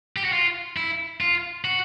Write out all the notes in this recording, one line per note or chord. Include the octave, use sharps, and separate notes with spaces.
G4
F#4
F4
E4
F4
F#4